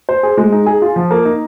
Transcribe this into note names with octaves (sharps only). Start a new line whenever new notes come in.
C5
G#4
G#3
D#4
G#4
F4
F3
A#3
D#4